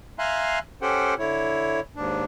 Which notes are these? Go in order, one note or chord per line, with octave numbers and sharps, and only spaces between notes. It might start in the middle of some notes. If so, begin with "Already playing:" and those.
E5 F5 G#5 A#5 C6 F#6
C#4 G4 A4 C5 F#5 G5
D3 E4 C#5
D#2 G#2 D4